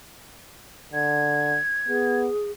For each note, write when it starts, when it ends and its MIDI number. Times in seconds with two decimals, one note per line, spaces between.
0.93 1.58 50
0.93 2.19 92
1.88 2.29 59
1.88 2.51 68